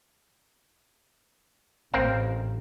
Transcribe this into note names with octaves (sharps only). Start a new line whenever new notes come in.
A1 C4 A#4 F5